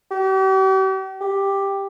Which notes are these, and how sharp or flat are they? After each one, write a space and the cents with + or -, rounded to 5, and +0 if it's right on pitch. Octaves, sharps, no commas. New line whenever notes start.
G4 -45
G4 +5